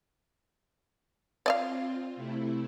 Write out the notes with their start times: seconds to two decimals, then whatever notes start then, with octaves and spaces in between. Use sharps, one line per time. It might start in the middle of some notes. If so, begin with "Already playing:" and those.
1.46 C4 F4 D5 D#5 F5
2.16 C3 A3 E4